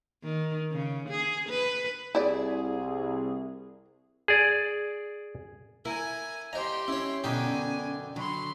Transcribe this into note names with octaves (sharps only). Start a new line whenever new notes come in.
D#3
C#3
G#4
B4
C2 E4 G#4 D5
G#4 D5
E4 A#4 G#5
G4 C5 D#5 E5 A#5 C6
C#4 E4 C#5
F#2 B2 D3 D#4 G4 G#5
D3 F#3 B5 C6